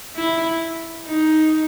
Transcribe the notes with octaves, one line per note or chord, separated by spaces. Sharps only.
E4
D#4